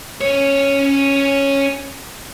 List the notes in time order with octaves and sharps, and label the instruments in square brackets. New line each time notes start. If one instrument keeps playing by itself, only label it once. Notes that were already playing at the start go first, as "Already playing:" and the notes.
[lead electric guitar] C#4 C#5